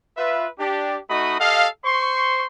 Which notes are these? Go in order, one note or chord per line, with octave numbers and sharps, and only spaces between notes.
F4 B4 E5
D4 G4
A3 D#4 F#4 D#5 B5 D#6
G4 A4 D#5 F5
C5 C6 C#6